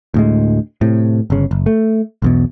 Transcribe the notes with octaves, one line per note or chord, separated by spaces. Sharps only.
D2 A2 G#3
A2 C3
G1 C#3
F#1
A3
B1 E2 B2